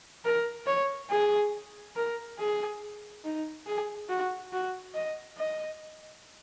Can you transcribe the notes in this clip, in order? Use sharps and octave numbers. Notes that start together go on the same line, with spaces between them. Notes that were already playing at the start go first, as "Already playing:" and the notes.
A#4
C#5
G#4
A#4
G#4
D#4
G#4
F#4
F#4
D#5
D#5